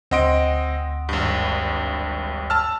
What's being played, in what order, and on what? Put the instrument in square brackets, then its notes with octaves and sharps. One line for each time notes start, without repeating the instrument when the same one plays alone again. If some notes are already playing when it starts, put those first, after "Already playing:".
[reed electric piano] D2 F#5 C6 [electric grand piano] C4 D#5 D7
[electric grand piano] G#1 G2
A5 E6 F6